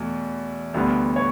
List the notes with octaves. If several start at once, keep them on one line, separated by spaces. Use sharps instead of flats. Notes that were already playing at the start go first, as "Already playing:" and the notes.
Already playing: E2 B2 A3
D2 D3 G3 B3
C#5